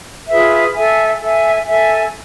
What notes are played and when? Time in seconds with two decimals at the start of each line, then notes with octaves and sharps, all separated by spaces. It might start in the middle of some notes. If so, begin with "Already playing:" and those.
0.29 F4 G#4 B4 E5
0.75 A4 E5 G#5
1.21 A4 E5 G#5
1.67 A4 E5 G#5